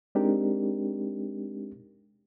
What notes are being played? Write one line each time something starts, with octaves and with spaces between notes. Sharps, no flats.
G#3 C4 D4 D#4 G4 A#4